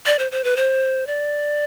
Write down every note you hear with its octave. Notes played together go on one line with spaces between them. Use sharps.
D5
C5
C5
B4
C5
D5